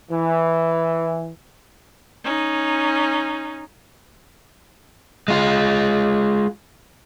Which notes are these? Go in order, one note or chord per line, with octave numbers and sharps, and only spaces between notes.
E3
C#4 D#4
G#3 F4